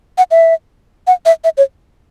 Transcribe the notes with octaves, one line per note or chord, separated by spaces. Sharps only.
F#5
E5
F#5
E5
E5
C#5